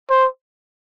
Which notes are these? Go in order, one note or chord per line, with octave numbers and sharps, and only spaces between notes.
C5